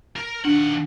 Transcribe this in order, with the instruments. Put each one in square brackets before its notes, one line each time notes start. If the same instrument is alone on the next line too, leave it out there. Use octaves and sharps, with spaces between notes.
[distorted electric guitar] A#4
[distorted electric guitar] D#2 F#5 [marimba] D4